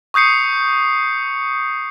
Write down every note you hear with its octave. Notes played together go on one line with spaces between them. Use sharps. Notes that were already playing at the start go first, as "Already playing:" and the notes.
C#6 D#6 G6 C7 C#7